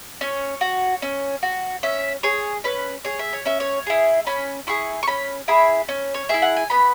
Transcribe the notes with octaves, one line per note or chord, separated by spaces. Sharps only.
C#4 C#5
F#4
C#4
F#4
C#4 E5
G#4 C#5
C#4 B4
G#4 C#5
E5
C#5
C#4 E5
C#5
E4 G#4
C#4 B5
E4 G#4 C#6
C#6
C#4 B5
E4 G#4 B5
C#4
C#5
E4 G#4 E5
F#5
G#5
B3 B5